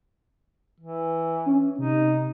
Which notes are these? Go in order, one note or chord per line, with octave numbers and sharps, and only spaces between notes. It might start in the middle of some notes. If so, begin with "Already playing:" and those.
E3
C#4
C3 D#4